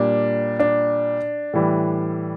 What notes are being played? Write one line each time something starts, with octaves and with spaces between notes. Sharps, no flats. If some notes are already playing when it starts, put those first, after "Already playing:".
Already playing: A#2 G3 D4
D4
A2 E3 G3